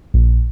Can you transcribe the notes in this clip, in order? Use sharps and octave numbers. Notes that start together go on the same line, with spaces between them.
A#1